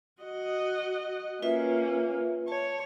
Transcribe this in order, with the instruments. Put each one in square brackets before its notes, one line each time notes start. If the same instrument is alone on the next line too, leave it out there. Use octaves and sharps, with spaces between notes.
[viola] F#4 D#5
[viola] A#3 C#4 [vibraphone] F4 B4 E5
[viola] C#5 [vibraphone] A5